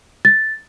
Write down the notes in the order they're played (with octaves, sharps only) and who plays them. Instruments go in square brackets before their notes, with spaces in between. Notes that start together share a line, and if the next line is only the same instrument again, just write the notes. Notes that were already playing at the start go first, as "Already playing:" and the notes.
[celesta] A6